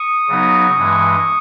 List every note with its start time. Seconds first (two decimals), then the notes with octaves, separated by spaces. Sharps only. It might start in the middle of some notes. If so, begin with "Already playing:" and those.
Already playing: C#6 D#6
0.29 C#3 F#3 B3 D#4
0.76 G2 E3 G#3